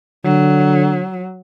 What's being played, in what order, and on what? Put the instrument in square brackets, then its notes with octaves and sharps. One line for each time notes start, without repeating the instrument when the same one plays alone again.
[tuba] D3 [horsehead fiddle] F#3